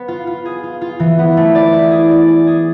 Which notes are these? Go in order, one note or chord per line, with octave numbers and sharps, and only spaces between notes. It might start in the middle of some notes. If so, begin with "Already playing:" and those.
Already playing: B3
F4
F4
G#4
F4
F4
E3
B3
A3
D5
E4
G#4
D5
D5
G#4